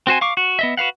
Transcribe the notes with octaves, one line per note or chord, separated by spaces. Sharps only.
C4 F#4 C5 G#5
F5 C#6 D6
F#4
B3 D#5 E5
F#4 B4 F5 F#5